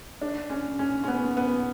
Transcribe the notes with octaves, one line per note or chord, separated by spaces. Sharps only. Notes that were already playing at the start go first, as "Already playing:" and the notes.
D4
C#4
C#4
C#4
B3
B3